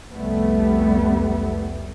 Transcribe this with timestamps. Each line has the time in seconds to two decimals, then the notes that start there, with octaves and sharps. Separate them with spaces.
0.12 F1 C2 G3 A3 B3